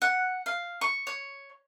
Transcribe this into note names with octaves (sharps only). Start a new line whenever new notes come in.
F#5
F5
C#6
C#5